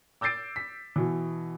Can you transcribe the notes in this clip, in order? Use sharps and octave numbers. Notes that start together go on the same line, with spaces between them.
D6 E6 G6 A6 C7 D7
B6
B2 E3